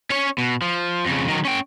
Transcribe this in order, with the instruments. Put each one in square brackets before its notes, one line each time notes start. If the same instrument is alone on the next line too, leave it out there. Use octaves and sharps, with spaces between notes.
[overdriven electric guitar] C#4 C#5
B2
F3
F2 C#3
D#3 F#3
C#4 G5